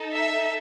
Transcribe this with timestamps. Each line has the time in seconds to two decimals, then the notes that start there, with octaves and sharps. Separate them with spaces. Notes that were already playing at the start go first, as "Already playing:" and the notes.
Already playing: D#4 A4
0.13 E5